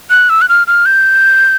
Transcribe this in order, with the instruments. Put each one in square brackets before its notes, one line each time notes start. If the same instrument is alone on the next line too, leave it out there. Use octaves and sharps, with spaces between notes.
[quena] F#6
E6
F#6
F6
F6
G6